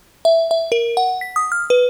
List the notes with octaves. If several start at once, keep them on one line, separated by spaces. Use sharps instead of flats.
E5
E5
A#4
F#5
B6
D#6
F6
B4